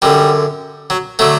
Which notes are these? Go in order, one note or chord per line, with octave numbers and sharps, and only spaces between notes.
F#2 D3 G3
F#3
D3 F#3 A3